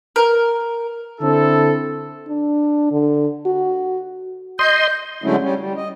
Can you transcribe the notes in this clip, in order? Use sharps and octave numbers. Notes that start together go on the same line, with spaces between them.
A#4
D3 C4 E4 A4
D4
D3
F#4
D#5 C6 G6
D3 F#3 G#3 A3 C#4 E4
G3 C#4
G3
D#5